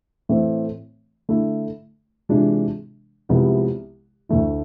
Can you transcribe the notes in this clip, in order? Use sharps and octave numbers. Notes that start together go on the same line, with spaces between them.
A2 E3 A3 C4
D3 A3 E4
C3 E3 G#3 D4 F4
C2 C3 F3 G#3 B3
D2 D3 A3 E4